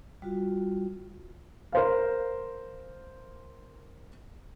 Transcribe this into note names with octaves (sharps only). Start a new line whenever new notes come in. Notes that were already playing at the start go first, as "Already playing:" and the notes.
G3 F4 F#4
A#4 C5 F5